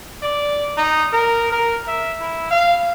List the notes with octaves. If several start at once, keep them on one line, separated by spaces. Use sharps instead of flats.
D5
D#4
A#4
A#4
E5
E4
F5